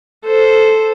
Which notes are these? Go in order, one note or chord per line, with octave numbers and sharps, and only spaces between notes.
A4 C5